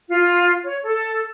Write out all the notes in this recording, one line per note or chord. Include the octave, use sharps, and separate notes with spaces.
F4
C#5
A4